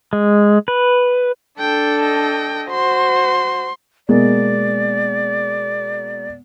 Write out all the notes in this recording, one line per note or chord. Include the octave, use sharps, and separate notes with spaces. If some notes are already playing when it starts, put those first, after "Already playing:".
G#3
B4
D4 A4 G5
D#5 G5
F#4 C5 C6
B2 G#3 A#3 D5